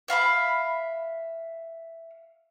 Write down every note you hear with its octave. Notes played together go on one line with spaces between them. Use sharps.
E5 F5 A#5 B5